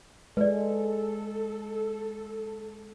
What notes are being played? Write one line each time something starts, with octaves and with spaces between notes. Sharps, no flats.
G#3 A4 B4 D5